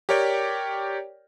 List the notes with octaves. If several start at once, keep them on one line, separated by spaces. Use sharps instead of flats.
G4 A#4 C#5 D5 G5